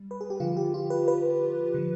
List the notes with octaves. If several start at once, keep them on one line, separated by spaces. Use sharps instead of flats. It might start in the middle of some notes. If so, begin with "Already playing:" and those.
Already playing: G3
B4
G#4
G4
D3 F3 F4
G4
F4
B4
B4
D3 F3